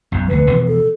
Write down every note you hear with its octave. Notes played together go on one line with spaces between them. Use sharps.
B1 F#2
F1 D2 D3 B4
B2 E3 F3
A4